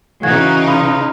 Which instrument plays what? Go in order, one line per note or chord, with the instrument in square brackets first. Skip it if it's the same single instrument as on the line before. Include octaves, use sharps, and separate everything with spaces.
[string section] C#3 D#4 [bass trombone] E3 [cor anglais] F#4 [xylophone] F5 G#5 G#6
[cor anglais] F4 [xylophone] B5 D#6